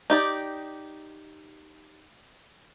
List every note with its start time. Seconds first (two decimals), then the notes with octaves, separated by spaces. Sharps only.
0.10 D#4 G4 D5